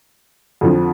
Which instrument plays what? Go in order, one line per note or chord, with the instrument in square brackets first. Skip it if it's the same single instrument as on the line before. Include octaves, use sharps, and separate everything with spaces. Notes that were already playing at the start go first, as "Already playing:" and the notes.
[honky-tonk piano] F2 D3 F3